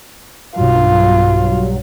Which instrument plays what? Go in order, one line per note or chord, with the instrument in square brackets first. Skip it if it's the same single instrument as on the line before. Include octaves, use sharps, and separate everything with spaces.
[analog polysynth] B1 G2 F#3 [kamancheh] F4